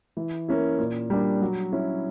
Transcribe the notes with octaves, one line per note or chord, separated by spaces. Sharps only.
E3
A#3 C#4 E4
A#2
G3 A#3 D4
F#3
C#4 E4